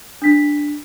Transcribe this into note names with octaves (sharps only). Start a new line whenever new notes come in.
D4 B6